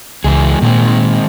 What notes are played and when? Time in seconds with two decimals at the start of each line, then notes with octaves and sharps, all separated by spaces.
0.24 C#2 E3 G#3 G#4
0.62 A#2 D#3 G#3 C4